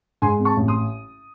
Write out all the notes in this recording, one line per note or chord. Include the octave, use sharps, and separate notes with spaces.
G#2 G#5 C6
C4
A5 C#6
A1
C6 D#6